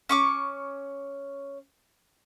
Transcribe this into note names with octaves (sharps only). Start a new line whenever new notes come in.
C#4 C#6 D6